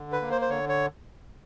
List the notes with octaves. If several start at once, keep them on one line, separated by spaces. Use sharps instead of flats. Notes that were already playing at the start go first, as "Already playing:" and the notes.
Already playing: D3
B4
A#3
C5
C5
D3 C#5
C#5